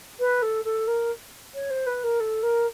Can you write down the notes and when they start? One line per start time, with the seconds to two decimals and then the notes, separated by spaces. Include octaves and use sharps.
0.19 B4
0.42 A4
0.64 A4
0.87 A#4
1.54 C#5
1.70 C5
1.86 B4
2.03 A#4
2.20 A4
2.42 A#4